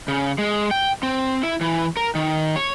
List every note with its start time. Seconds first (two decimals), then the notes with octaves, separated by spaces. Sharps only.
0.08 C#3
0.38 G#3
0.71 G5
1.03 C4
1.43 E4
1.61 E3
1.97 A#4
2.15 D#3
2.56 C#5